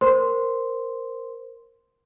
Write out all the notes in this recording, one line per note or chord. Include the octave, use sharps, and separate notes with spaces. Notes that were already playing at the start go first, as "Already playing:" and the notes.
A#4 C5 C6